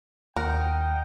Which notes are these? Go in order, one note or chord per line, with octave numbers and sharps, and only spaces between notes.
D#2 D#4 A#4 F#5 G5